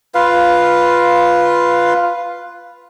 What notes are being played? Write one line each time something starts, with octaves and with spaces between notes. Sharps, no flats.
F4 B4 F5